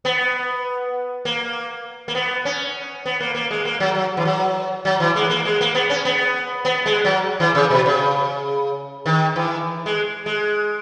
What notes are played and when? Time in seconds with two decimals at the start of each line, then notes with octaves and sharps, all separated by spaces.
0.05 B3
1.25 A#3
2.08 A#3
2.15 B3
2.45 C#4
3.05 B3
3.20 A#3
3.35 A#3
3.51 G#3
3.65 A#3
3.80 F#3
3.95 F#3
4.17 E3
4.25 F#3
4.85 F#3
5.00 E3
5.16 G#3
5.30 A#3
5.45 G#3
5.61 A#3
5.75 B3
5.90 C#4
6.05 B3
6.65 B3
6.86 G#3
7.05 F#3
7.40 E3
7.55 C#3
7.70 B2
7.86 C#3
9.06 D#3
9.36 E3
9.86 G#3
10.26 G#3